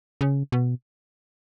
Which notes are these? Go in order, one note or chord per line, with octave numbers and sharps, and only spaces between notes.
C#3
B2